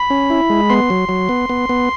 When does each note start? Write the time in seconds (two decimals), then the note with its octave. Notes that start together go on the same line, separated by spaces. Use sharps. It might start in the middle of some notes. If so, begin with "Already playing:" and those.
Already playing: B5
0.10 C#4
0.30 E4
0.50 G#3
0.70 B3 C6
0.90 F#3
1.09 F#3
1.29 B3
1.49 B3
1.69 B3